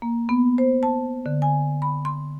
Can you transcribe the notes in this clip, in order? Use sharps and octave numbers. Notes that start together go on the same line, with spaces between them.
A#3
B3
C5
A5
D3
G#5
B5
C6